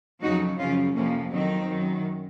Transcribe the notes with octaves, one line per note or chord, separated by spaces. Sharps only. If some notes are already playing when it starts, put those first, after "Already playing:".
F2 C#3 F#3 D#4 F#4
F#2 C#3 F3 C#4 F4
F2 C3 F3 A#3 C#4
F2 D#3 F#3 C4 D#4
F#2 D#3 F#3